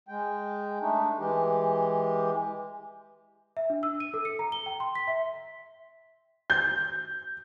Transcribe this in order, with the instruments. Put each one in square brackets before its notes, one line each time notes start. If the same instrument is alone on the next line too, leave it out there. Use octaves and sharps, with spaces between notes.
[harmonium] G#3 G5
A3 D4 D#4
E3 G#3 G4
[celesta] E5
D4
E6
D#7
A4
C#7
A#5
G7
G5
C6
B6
E5
[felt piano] G6